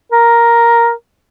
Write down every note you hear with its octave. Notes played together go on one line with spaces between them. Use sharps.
A#4